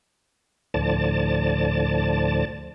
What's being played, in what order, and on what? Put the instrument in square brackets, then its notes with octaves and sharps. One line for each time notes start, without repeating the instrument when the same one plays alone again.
[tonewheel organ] D2 A2 D3 F3 D5 A5